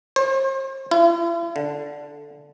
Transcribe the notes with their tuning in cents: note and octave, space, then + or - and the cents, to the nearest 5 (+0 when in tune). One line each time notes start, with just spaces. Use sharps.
C5 +40
E4 +45
D3 -5